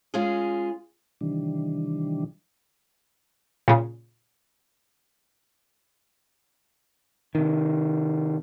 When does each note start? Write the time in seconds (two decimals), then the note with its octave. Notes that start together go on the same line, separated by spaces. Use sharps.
0.14 G#3 C#4 F4 G#4
1.21 C3 D#3 E3 G3 D4
3.68 A#2 C#3
7.35 C3 D#3